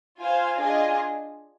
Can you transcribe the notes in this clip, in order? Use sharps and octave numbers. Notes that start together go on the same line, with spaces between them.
F4 C5 F5 G#5
D4 F4 G#4 D#5 G#5